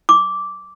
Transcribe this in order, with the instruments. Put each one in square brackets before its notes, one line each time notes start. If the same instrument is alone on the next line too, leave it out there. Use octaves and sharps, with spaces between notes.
[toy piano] D6